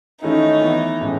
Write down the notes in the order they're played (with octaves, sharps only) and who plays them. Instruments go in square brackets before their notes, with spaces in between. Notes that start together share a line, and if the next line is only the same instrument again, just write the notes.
[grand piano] D#3 A3 C#4 E4 [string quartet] D#4
[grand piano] E3 B3 E4
A2 E3 G#3 C#4